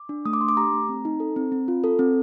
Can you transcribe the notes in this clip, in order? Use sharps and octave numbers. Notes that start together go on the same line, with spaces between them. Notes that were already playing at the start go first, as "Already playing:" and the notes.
Already playing: D6
D4
A3 D#6
D6
D4 C6
D6
G4 A#5
A3
C4
D#4
A4
C4
C4
F4
A4
C4